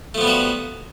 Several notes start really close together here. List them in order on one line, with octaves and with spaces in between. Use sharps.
A3 F3 B3 G3 F#4